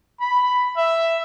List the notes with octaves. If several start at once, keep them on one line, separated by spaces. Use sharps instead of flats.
B5
E5